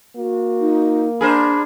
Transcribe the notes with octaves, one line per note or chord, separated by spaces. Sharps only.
A#3 F#4
D#4
D4 G#4 A#4 C5 B5